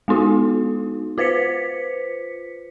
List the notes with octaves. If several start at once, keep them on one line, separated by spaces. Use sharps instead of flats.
G#3 B3 D#4 F#4
F4 B4 C5 B6 C#7